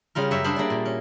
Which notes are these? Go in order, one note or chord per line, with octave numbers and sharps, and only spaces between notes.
C#3 G3 F4 A#4
F#2 C#5 E5
G3 C#4 D4 G#4 C5 E5
A#3 D4 D5
A#2
C#4